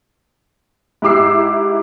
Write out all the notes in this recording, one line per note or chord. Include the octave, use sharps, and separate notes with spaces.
G#2 E4 G4 D6 E6 C7